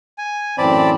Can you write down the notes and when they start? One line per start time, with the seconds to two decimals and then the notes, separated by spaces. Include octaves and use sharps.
0.18 G#5
0.58 F#2 A2 E3 C4 D5 A5 B5